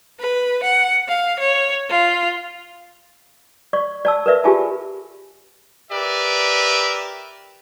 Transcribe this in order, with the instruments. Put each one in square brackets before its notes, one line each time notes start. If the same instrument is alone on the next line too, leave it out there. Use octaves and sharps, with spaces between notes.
[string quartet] B4
F#5
F5
C#5
F4
[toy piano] D5 C#6
D5 A5 E6
A#4 B4 D5 E5
F4 G4 G#4 E5 G#5 A5
[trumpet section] G4 A#4 B4 D5 E5